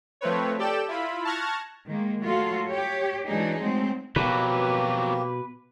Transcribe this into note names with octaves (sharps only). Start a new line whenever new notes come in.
F3 A3 C4 B4 C#5
G4 A4 D5 G5 E7
E4 F4 B5
A5 C#6 F6 F#6 G#6 A#6
D#3 G#3 A#3
F#3 A3 F4 F#4 A4
G4 C#5
E3 F#3 G#3 D4 D#4 G#4
F#3 G#3 A3 C4
F2 B2 F#3 A#3 G4 B4